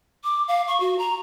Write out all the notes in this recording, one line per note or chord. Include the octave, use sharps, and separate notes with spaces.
D6
F5
C#6
F#4
A#5